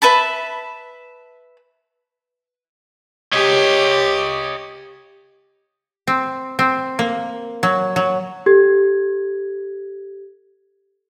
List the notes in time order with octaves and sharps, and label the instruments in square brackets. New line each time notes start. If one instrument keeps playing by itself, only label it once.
[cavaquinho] B4 E5 A5 B5
[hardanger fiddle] G4 [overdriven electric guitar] C#5 D#5
[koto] C4
C4
A#3
F#3
F#3
[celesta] G4 A4 G#6